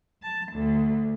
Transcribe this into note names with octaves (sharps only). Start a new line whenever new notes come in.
A5
D2